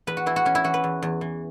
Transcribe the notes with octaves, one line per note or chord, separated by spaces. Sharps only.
E2 B4
F#4
E3 E4
F#4
E3 C#4
E4
E3 F#4
B4
E2
E2
E3